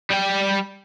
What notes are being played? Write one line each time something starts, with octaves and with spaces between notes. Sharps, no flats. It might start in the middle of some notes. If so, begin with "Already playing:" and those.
G3 G5